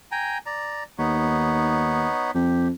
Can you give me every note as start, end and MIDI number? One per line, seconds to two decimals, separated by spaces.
0.12 0.38 79
0.12 0.38 80
0.12 0.38 82
0.46 0.83 74
0.46 0.83 82
0.98 2.07 39
0.98 2.31 59
0.98 2.31 63
0.98 2.31 73
2.35 2.70 41
2.35 2.68 67